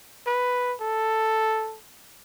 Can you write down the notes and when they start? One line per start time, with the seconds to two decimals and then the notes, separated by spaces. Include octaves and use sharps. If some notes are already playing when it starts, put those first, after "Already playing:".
0.27 B4
0.81 A4